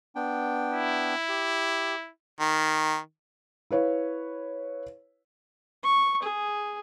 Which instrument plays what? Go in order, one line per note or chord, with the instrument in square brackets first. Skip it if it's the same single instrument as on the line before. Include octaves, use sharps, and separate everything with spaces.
[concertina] B3 D4 G5
[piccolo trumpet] E4
[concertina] G4
[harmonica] D#3
[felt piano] E4 B4 C#5 F5
[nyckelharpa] C#6
G#4